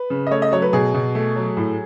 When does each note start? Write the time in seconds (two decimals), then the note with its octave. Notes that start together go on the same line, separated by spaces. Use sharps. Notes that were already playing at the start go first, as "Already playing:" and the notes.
Already playing: B4
0.10 C#3
0.27 D#5
0.31 A3 C#5
0.42 D#5
0.52 F#3 C#5
0.62 B4
0.73 B2 G#4
0.94 B2
1.15 A3
1.36 F#3
1.57 A2